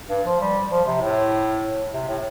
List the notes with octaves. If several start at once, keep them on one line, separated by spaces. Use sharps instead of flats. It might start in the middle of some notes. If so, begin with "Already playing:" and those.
G2
F3
G3
F3
C3
A2
C3
A2